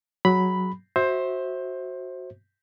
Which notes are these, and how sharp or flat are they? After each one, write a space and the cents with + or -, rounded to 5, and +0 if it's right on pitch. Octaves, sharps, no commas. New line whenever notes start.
F#3 +0 G#4 +20 B5 +0
F#4 +0 C5 +15 E5 -20